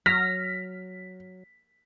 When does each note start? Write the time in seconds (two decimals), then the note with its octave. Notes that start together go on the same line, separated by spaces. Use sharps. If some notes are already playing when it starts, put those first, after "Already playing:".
0.06 F#3 F6 A#6 B6